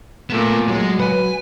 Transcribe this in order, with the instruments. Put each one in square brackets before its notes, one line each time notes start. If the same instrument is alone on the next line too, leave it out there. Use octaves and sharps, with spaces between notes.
[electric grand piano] A#2 A3 E7 [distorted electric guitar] B3 A#4
[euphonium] F#3 [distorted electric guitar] G#3
[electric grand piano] B4 [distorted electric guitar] F#5 G#5